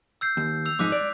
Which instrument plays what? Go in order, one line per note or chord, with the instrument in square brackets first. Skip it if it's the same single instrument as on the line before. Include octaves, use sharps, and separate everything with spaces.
[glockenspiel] E6 G6 C7
[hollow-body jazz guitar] D#2
[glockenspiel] E6 F7
[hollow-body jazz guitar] F2 G#2 D#4 [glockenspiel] D6 F#6 B6
[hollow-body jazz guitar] D5